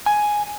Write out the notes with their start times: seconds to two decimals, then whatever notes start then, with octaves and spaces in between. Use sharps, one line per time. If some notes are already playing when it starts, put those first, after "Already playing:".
0.06 G#5